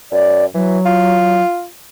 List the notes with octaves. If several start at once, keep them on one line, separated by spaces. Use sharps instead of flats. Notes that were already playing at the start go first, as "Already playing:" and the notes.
F#2 D5
E3 F#3
F4